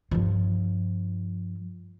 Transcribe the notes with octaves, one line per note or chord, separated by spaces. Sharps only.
G2 F3